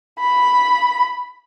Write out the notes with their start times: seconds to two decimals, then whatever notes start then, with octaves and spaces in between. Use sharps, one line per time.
0.19 B5